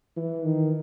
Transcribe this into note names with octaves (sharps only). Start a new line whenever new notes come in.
E3
D#3